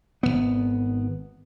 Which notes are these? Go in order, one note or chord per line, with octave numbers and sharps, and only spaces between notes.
G#1 D#2 B3